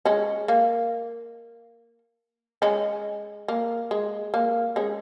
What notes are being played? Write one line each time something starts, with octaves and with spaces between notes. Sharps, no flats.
G#3 C#4
A#3
G#3 C#4
A#3
G#3
A#3
G#3 C#4